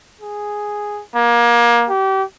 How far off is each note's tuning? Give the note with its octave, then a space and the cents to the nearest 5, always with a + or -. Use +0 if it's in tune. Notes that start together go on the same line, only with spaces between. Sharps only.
G#4 +0
A#3 +25
G4 -30